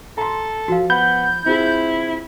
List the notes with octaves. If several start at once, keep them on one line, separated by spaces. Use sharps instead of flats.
A4 A#5 C6
F3 F#4 F5
B3 B5 G6
C4 E4 F4 G#4